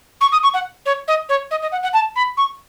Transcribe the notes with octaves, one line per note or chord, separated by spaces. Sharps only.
C#6
D#6
C#6
F#5
C#5
D#5
C#5
D#5
D#5
F#5
F#5
A5
B5
C#6